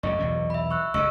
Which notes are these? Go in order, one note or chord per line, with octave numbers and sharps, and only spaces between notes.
F#2 A2 C#3 D5 D#5 C#6
B1 E2 C3
E5 B5
C#6 E6 F#6
C#2 F#2 C#3 D#5 C#6 E6